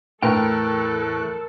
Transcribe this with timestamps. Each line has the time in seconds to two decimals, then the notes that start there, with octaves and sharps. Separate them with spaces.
0.23 E2 A2 E3 A4 A#4 G5 F#6